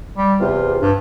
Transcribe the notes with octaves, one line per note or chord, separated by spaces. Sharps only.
G3
E2 C3 F4
G2